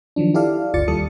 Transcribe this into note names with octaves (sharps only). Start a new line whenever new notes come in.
D#3 F3 F#3 D4
E4 G4 A4 D5 F5
G1 D2 F4 D5 A6 C#7
D#2 G3 A4 D#6 C#7